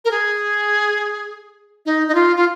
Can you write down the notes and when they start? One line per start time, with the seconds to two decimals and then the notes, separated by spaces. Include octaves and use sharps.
0.05 A#4
0.11 G#4
1.86 D#4
2.08 D#4
2.15 F4
2.36 F4